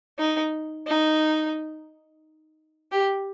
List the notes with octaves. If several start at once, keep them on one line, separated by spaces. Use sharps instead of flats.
D#4
D#4
G4